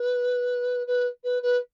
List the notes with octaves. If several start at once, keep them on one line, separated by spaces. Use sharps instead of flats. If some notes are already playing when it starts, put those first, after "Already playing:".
Already playing: B4
B4
B4
B4